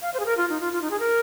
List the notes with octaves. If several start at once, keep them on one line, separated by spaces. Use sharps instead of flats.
F5
C5
G#4
A#4
F4
D#4
F4
F4
D#4
G#4
A#4